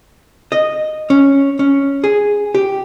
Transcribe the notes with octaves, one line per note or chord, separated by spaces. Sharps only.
D#5
C#4
C#4
G#4
G4